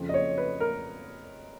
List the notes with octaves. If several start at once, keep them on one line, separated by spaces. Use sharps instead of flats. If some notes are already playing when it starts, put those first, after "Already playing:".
Already playing: F2 C#3 F3
D#5
C#5
B4
A#4